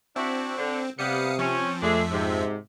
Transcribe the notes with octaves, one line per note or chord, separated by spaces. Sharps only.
C4 D4 E4 F#4
D3
C3 G3 B3 F5 D#6 C#7
F3 C4 C#4
F2 F3 G#3 A3 D4 G#4 E5
G#2 C3